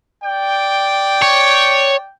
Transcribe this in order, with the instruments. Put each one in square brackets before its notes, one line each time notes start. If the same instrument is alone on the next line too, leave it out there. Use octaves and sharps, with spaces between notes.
[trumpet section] D5 G5
[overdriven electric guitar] C#5